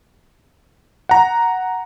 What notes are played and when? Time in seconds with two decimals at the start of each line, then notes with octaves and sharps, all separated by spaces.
1.09 F#5 A#5